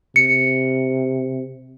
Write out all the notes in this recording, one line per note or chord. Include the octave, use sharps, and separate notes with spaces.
C3 C#7